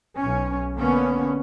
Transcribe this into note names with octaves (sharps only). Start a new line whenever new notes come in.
B1 C#4
D3 A#3 B3 C#4